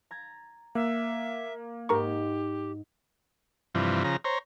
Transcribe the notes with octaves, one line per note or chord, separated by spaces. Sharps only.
A#5 G#6 A6
A#3 E5 F#6
G#2 D#4 G4 A#4 A#5 C#6
G2 C3 E3 F3
C#3 F3 A#5
C5 C#5 A#5